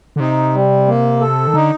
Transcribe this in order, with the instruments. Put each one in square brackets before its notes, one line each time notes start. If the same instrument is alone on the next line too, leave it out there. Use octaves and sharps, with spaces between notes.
[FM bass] D3
[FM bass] C3 [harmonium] D#4
[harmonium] G3
A#3
A4
[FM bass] D#3
[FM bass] D3 [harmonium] D#4